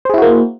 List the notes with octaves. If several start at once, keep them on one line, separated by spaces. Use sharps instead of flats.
A#3 E4 F#4 G#4 C5